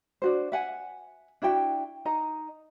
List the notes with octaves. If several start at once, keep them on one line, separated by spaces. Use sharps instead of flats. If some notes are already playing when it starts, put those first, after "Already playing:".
D4 F#4 C5
E5 F#5 G#5
D4 E4 F#4 G5
D#4 D#5 A#5